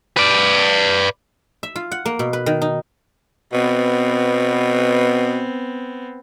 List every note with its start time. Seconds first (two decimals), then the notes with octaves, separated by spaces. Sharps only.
0.17 B4 D5
1.63 E5
1.76 F4
1.92 F#5
2.05 A#3
2.19 B2
2.33 B4
2.46 D#3
2.62 D#4
3.53 B2 B3 C4